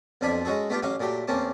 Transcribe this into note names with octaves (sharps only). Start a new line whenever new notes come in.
B1 F2 F3 D4 G#5 B5
G#3 C#4 F#4 G#4 A4
A3 B3 D4 F4 G4
A1 F#3 C#4 F5 D6
A#2 F#3 A3 G4
E2 A#3 C4 C#4 A5 D6